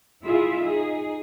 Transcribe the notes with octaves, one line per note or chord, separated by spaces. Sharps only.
E4 F4 G#4 E5
D#4 G#4